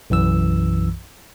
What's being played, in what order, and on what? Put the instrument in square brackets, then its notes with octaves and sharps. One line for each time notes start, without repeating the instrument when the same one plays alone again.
[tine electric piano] B1 F#2 E3 E6